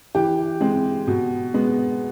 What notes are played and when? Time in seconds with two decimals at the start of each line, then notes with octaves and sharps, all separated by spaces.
0.15 E3 G4
0.61 G#3 C4
1.07 B2
1.54 G#3 B3